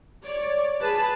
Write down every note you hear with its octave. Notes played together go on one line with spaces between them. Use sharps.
C#5 D5
G#4 B4 A5